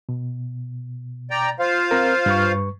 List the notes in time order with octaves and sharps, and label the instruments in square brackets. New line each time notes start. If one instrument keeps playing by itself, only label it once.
[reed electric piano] B2
[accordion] D5 G5 A#5
F4 C5 F5
[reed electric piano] C4 A#4
G2 B4 C#6